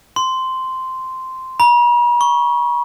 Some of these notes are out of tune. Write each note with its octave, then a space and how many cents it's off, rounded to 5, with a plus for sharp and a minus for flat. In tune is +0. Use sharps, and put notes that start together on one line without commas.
C6 -10
B5 -45
C#6 +0